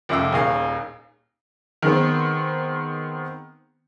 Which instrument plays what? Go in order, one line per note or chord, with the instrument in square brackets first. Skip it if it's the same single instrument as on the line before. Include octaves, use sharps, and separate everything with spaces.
[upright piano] F1 C#2 E5 D6 E6
D#1 D#2 G#4 F5
[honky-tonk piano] D#3 G#3 B3 C4